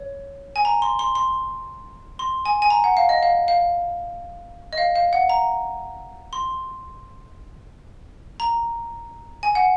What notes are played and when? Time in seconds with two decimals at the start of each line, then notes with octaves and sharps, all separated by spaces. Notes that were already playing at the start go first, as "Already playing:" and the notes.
Already playing: C#5
0.56 G#5
0.65 A#5
0.82 C6
0.99 C6
1.15 C6
2.19 C6
2.46 G#5
2.62 G#5
2.70 A#5
2.84 F#5
2.97 F5
3.09 D#5
3.23 F5
3.48 F5
4.73 D#5
4.78 F5
4.95 F5
5.13 F#5
5.29 A#5
6.33 C6
8.40 A#5
9.43 G#5
9.55 F#5